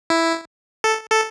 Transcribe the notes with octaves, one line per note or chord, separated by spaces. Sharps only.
E4
A4
A4